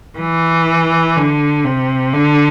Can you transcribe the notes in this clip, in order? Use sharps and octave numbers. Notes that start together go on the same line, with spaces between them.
E3
D3
C3
D3